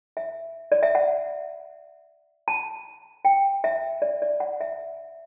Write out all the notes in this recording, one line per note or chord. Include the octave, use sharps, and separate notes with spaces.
E5
D5
E5
F#5
A5
G5
E5
D5
D5
F#5
E5